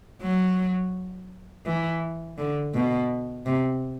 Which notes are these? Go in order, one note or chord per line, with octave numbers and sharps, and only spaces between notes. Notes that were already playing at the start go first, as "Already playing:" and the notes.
F#3
E3
D3
B2
C3